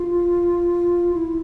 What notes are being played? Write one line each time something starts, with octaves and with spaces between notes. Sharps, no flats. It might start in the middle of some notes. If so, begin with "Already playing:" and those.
Already playing: F4
E4